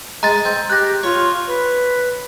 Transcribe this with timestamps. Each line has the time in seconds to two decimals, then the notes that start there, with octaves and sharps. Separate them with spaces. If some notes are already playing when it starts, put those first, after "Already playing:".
0.23 G#3 D#5 A#5 A6
0.45 C4
0.70 G4 F#6 G6 A#6
1.03 F4 C#5
1.47 B4